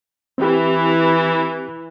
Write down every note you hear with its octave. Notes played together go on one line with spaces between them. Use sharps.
E3 C4 G4